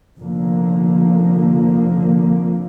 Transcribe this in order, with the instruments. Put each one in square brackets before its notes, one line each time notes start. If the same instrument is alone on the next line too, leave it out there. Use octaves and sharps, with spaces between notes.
[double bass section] F1 F2 D3 F3 A#3